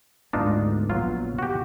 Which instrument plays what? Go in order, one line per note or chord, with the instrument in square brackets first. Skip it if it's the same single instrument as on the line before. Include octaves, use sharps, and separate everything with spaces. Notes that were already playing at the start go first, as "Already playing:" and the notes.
[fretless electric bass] D2 G#2 B3 [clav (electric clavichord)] D4 D#4 F4
[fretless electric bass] A#1 B3 [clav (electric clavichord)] F#3 F4
[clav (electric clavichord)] F#4 G4